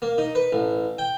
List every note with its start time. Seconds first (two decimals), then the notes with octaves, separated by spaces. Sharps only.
0.02 A#3
0.18 D#4
0.35 B4
0.53 A1
0.98 G5